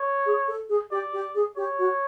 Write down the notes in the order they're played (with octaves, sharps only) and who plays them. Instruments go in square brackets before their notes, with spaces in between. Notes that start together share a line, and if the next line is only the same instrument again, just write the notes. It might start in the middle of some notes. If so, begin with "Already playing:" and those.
Already playing: [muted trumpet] C#5
[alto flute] G#4
A4
G#4
[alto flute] G4 [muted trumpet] D5
[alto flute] G4
G#4
[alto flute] G4 [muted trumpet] C#5
[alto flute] F#4